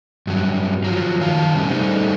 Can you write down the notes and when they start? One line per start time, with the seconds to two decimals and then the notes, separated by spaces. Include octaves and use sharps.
0.27 G2 F#3
0.84 F3 F#3
1.19 F#2 D#3 F5 A5
1.54 C3 G3 A3 C#4 G4
1.70 G3 A3 D#4 C5